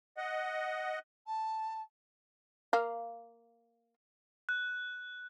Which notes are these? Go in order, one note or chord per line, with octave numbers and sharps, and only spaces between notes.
D#5 F#5
A5
A#3 F5
F#6